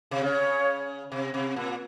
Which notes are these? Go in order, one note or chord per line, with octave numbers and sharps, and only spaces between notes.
C3
C#3 C#5
C3
C3
A#2